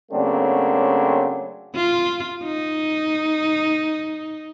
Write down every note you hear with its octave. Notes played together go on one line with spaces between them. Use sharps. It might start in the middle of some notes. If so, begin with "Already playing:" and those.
C#3 F#3 A3 A#3 C4 D4
F4
D#4